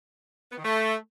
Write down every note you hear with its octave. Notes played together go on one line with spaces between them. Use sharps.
B3
D#3
A3